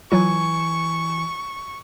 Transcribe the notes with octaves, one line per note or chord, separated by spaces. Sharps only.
E3 F#3 F4 G#5 C#6